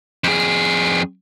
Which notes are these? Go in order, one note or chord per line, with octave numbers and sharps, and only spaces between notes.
F2 G#4